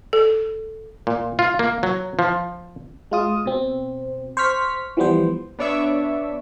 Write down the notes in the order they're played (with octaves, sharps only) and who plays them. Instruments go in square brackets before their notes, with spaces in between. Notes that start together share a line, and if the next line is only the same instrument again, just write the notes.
[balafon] A4
[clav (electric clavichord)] A#2
F4
A#3
F#3
F3
[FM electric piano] G#3 F4 D#6
B2 C4
C5 C#6 F6 B6
E3 F3 G3 B3 C5
[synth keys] B3 D4 C#5 D5 E5